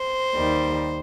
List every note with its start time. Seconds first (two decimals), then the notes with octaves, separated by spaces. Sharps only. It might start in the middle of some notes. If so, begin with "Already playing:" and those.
Already playing: C5
0.33 D#2 D#3 G3